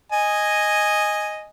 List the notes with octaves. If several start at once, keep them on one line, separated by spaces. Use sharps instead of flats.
D#5 G#5